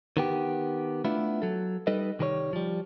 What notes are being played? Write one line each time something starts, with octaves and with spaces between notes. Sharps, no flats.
D#3 B3 G4
A3 B3 D4 E4 F4
F#3 A4
G3 D#4 A4 B4 D#5
C2 D#3 G3 A#4 C#5
F3 G3